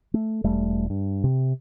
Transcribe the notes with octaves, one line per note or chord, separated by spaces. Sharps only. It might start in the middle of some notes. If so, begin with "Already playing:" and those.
A3
E1 G3 A3
G2
C3